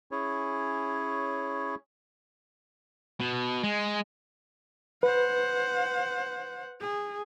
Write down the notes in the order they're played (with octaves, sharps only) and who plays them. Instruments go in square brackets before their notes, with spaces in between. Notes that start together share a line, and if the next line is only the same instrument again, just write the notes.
[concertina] C#4 E4 G#4 C#5
[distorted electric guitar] B2
G#3
[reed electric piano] B4 [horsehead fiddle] C5 F#5
[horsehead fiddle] G#4